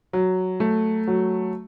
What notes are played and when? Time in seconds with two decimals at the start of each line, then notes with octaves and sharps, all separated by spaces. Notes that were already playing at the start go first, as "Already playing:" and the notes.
0.13 F#3
0.60 A3
1.07 F#3